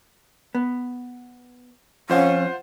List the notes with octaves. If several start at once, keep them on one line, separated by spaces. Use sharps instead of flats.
B3
F2 C#4 F4 C5 F5 F#5